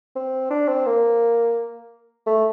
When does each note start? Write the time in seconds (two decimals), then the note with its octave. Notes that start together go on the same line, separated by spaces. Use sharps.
0.16 C4
0.51 D4
0.68 C4
0.86 A#3
2.27 A3